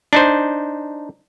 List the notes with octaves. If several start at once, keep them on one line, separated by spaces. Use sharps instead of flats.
D4 D#4 C5